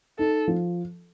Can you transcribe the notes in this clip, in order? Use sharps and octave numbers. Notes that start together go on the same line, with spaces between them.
D#4 A4
F3